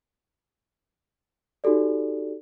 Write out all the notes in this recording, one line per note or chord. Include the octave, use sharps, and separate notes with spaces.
D#4 F#4 G4 A4 D5